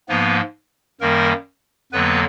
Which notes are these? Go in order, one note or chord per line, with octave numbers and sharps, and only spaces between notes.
G#2 F3 A#3 B3 B4
F#2 D#3 G3 A#3 A#4
F2 D3 F#3 A#3 B3 B4